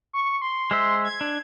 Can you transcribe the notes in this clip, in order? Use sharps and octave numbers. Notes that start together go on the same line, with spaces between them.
C#6
C6
G#3 C5 E5
G#6
D4